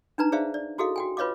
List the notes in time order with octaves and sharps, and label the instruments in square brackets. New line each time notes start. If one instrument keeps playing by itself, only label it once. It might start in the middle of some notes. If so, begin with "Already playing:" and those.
[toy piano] D4 D#4 B4 A#5
G#4 C5 D5 E5 F5
D5
E4 F#4 G#4 A4 D#5 F5
F#4 G5 G#5
F4 B4 C#5 D#5 F5 D6